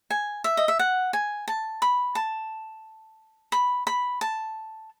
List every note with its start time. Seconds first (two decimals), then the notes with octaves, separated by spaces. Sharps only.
0.10 G#5
0.44 E5
0.57 D#5
0.68 E5
0.79 F#5
1.13 G#5
1.48 A5
1.82 B5
2.15 A5
3.52 B5
3.87 B5
4.21 A5